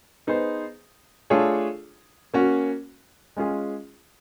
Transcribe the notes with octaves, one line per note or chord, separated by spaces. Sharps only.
B3 D#4 G#4 C5
A3 D4 F4 G#4 C#5
A#3 C#4 F#4
G#3 C#4 F4 G#4